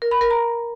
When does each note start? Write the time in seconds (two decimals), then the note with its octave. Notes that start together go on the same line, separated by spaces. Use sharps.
0.02 A#4
0.11 B5
0.21 A#4
0.31 A#5